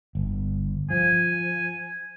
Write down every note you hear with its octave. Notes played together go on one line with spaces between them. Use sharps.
G1
F3 G#5